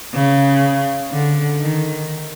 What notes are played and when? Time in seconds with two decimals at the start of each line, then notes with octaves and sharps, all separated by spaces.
0.14 C#3
1.12 D3
1.60 D#3